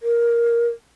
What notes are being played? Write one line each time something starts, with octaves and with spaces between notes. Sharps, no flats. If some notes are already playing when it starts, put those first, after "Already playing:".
A#4